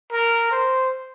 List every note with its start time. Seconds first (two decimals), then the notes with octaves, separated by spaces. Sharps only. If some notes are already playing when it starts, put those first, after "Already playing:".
0.12 A#4
0.52 C5